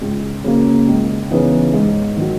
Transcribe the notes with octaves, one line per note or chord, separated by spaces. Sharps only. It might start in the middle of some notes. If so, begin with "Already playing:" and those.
C#2
C#3 F#3 A#3 C#4
C#2
C#3 E3 B3 D#4
G#2
D#3 F#3